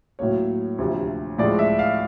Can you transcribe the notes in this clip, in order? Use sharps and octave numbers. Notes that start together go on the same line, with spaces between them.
A2 F#3 A#3 C#5
D2 C3 F3
A2 F3 G#3 D5
E5
F5